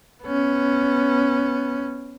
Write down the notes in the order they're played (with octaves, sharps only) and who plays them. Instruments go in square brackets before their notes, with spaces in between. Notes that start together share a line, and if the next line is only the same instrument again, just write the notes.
[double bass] B3 C#4